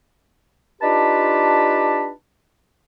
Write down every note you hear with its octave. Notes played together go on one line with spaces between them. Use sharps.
D4 D#4 F4 G4 B4 A5